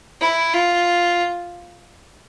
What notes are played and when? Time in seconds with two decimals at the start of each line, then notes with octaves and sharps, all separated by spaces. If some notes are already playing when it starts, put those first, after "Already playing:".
0.21 E4
0.53 F4